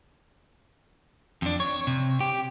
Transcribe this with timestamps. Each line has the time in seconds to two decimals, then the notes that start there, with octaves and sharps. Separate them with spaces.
1.42 F2 D4
1.60 C#5
1.87 C3
2.20 G4